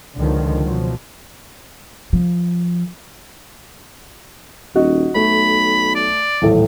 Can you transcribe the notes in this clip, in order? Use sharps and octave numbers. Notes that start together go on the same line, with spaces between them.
C#2 D3 D#3 F3
B2 F3 F#3
F3
D#1 F#4 D#5
B1 A3 B5
D5
D#1 A1 A2 A4